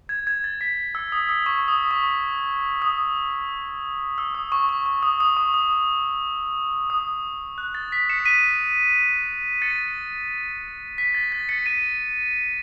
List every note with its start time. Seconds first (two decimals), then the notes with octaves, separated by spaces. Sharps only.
0.09 G#6
0.27 G#6
0.44 A6
0.61 B6
0.95 E6
1.12 D#6
1.29 E6
1.46 C#6
1.68 D#6
1.91 C#6
2.82 D#6
4.18 E6
4.35 D#6
4.52 C#6
4.69 C#6
4.86 C#6
5.03 D#6
5.20 D#6
5.37 C#6
5.54 D#6
6.90 D#6
7.58 F#6
7.75 A6
7.92 B6
8.10 C#7 E7
8.25 B6 D#7
9.62 A6 C#7
10.98 B6
11.14 A6
11.32 A6
11.49 A6 C#7
11.66 B6 D#7